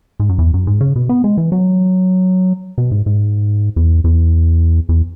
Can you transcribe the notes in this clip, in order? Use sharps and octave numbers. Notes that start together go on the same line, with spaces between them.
G#2
F#2
E2
F#2
G#2
C#3
B2
B3
G#3
E3
F#3
B2
G#2
G#2
E2
E2
E2